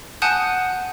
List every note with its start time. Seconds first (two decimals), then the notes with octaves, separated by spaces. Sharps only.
0.22 F#5 G#5 A5 D#6 F#6 G6